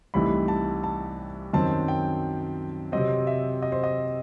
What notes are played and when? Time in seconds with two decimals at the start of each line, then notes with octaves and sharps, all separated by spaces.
0.14 C2 C3 E3 A3 D#4 B5
0.48 A5
0.84 A5
1.53 F#2 D#3 F#3 C4 A5
1.88 G5
2.92 C3 F#3 C4 D#5
3.27 E5
3.62 D#5
3.72 C5
3.83 D#5